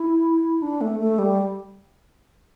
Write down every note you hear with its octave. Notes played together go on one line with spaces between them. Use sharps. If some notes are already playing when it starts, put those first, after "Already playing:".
Already playing: E4
D4
A3
A3
G3